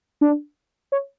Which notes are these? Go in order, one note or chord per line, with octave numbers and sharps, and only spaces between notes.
D4
C#5